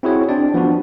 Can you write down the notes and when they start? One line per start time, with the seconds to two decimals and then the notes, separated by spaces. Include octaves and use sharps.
0.03 C4 E4 F#4 G#4 C#5
0.29 C4 D4 D5
0.54 F3 B3 D4 F#4